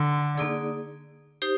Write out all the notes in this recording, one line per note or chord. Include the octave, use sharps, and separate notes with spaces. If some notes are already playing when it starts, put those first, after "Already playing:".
Already playing: D3
A#3 D#4 G#4 D5
D#4 G4 C5